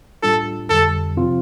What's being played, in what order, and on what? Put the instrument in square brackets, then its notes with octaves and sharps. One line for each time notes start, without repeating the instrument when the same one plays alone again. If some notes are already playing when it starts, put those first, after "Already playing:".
[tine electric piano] A2 G3 D4 F4 [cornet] A4
[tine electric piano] F2 D3 G3 [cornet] A4
[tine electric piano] C3 F3 C4 F4